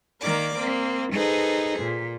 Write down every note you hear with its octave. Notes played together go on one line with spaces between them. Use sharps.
D#3 A#3 A#4 D5 D6
A#3 C4
D#4 G#4 A4 B4 C5
A#2